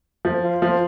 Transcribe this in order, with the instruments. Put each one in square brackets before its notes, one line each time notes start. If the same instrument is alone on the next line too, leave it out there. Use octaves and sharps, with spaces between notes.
[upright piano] F3
[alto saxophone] F4
[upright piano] F3